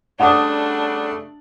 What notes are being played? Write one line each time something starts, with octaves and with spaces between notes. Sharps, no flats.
C#3 G3 A3 D4 F#5 D6 D#6